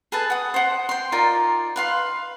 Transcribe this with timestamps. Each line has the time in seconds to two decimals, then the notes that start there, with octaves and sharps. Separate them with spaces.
0.12 G#4 A4 B4 A5
0.30 F#5 D#6
0.54 C5 F#5
0.89 G5 C6
1.12 D#4 F4 A#4 D5
1.76 B4 F5 C6